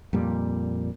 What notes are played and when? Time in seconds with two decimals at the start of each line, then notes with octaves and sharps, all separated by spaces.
0.13 F2 A#2 G3